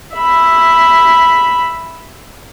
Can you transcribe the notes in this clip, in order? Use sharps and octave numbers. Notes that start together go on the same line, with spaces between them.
E5 B5